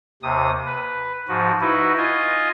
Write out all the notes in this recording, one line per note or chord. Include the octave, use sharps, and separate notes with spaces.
D#2 C3 D#6
B4
G#2 F3 F#4
D#4 E4 F#4 B4
F4 D#5 G#5